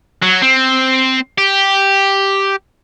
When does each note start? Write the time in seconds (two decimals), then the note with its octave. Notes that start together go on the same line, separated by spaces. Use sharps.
0.22 F#3
0.42 C4
1.38 G4